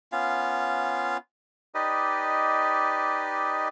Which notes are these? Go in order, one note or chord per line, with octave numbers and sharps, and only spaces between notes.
B3 C#4 F4 F5
D#4 G4 B4 D5 D#5